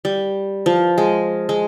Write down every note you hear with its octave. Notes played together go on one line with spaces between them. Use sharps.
G3
F3
G#3
G#3